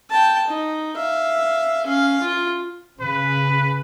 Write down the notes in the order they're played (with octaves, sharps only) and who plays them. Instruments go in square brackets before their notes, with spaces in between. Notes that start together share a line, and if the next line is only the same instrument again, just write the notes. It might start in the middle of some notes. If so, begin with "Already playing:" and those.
[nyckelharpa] G5 A5
D#4
E5 F5
C#4 F5
F4
[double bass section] C#3 [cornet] B4